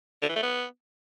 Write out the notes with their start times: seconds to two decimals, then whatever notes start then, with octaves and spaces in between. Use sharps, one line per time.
0.22 D3
0.29 E3
0.36 A3
0.43 B3